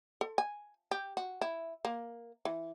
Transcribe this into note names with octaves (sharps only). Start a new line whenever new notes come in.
A4
G#5
G4
F#4
E4
A#3
E3